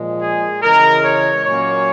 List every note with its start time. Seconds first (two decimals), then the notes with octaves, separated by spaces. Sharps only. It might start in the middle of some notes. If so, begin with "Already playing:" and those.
Already playing: A#2 F3 G#3
0.21 G#4
0.62 C#3 E3 G#3 A#4
1.04 C#5
1.44 A#2 F#3 A#3 C#4 C#5